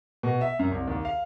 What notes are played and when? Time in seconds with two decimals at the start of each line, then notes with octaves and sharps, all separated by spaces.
0.23 B2
0.41 E5
0.59 F#2
0.71 C2
0.88 D#2
1.05 F5